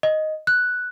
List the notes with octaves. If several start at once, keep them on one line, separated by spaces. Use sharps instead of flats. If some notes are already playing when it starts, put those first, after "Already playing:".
D#5
F#6